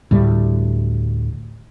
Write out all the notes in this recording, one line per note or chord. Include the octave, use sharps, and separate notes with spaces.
D2 A2 G3